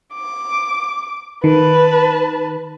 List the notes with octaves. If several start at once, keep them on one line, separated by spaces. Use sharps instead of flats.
D6
D#3 B4 A5